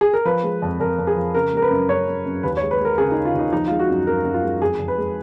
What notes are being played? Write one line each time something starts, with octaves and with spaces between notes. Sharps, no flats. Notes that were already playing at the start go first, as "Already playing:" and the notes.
G#4
A#4
F3 B4
G#3
F2
F2 A#4
F2
G#4
F3
C#3 A#4
G#3 A#4
B4
F#2
F#2 C#5
F#2
F#2
D#2 B4
C#5
G#3
B4
G#3
A#4
C#3 G#4
D#4
C#3
F4
D#2 D#4
F3 D#4
G#3 F4
F#4
F#2
F#2 A#4
F#2
F4
G#3
F2 G#4
F2
B4
G#3